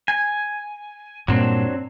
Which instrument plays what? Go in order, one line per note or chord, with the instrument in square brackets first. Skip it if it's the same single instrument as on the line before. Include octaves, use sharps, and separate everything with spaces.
[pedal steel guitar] G#5
[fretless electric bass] G2 A#2 [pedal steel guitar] F#3 C4 D4